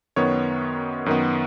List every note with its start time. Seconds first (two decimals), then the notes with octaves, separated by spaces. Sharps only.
0.16 F#2 D#3 B3 C#5
1.06 F#2 D#3 B3